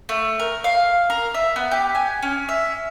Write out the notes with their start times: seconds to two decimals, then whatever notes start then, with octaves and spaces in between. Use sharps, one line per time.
0.09 A3
0.40 A#4
0.64 F5
1.10 A#4
1.34 E5
1.56 B3
1.71 G4
1.95 G#5
2.22 C#4
2.49 E5